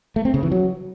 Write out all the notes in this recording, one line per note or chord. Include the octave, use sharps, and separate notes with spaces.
A3
C4
C#3
E3
F#3